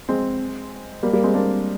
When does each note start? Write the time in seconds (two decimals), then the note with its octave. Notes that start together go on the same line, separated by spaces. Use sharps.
0.09 G#3 C4
1.03 G3 A#3
1.13 G3 A#3
1.23 G#3 C4
1.34 A#3 D4